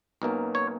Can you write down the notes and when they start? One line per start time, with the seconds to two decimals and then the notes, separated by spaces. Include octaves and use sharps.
0.22 B1 B2 A#3 C#4
0.55 C#5